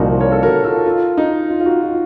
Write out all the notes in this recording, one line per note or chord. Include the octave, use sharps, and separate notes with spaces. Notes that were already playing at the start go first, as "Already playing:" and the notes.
Already playing: C2 A#2 F3 D#4 F#4
A#4 C#5
A4
F#4 A#4
F4 A4
F4
D#4
F4
F4
D#4 F#4
F4